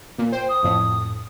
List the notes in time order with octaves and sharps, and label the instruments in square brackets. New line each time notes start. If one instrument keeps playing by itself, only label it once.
[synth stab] A#2
[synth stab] C5 [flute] G5
[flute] D#6
[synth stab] F2 A2